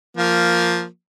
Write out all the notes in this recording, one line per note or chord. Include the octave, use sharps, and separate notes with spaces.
F3 A#3